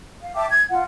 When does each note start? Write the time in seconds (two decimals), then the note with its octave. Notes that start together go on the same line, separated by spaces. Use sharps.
0.21 F5
0.35 E5 G5 A5 D6
0.49 G#6
0.70 F4 F#5